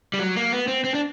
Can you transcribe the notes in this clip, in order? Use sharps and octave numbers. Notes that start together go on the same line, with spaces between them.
G3
F#3
A#3
B3
C4
C4
D4